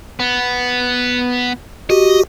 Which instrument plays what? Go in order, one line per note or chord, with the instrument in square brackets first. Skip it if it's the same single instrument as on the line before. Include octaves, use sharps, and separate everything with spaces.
[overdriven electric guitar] B3
[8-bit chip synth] F#4 G4 [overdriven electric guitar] D#5